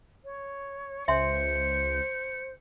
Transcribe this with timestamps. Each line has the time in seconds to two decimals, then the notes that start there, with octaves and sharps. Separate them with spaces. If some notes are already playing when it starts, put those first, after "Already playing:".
0.25 C#5
1.08 C#2 C5 E5 G#5 C6 C#7